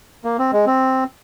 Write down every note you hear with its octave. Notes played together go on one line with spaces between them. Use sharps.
A#3
C4
G#3
C4